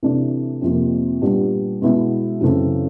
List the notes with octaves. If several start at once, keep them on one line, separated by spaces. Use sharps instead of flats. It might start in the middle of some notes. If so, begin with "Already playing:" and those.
C3 E3 A3 D4
F2 C3 F3 A#3
A#2 G3 B3 D4 G4
B2 G#3 B3 E4
F#2 C#3 E3 A3 C4